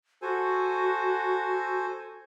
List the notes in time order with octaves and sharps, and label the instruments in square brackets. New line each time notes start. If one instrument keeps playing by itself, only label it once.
[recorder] F#4 [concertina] A4 C5 G#5